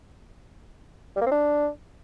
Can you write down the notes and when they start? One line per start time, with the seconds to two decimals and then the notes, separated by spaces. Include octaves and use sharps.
1.16 G3
1.21 A#3
1.26 C4
1.32 D4